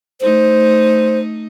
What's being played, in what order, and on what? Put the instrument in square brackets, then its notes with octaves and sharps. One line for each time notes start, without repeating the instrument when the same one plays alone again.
[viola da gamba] A3 D#4 [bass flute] C5